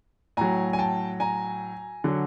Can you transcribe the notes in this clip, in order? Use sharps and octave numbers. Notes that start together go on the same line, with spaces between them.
A2 F#3 G#5 A#5
G#5
G5 A5
G#5 A#5
D3 F#3